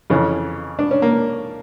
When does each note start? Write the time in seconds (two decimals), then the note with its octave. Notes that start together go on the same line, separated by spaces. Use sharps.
0.10 F2 C#3 E3
0.79 D4
0.91 C#4
1.02 A#3